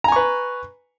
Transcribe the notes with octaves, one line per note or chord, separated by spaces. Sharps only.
B4 G#5 A#5 C#6